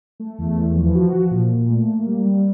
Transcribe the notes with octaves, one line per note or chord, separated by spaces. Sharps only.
A3
E2
E3
F3
F#4
F3
A#2
A#2
A3
A#3
G3
G3